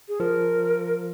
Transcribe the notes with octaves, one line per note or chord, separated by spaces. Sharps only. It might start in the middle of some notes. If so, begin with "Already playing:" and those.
G#4
F3 A#4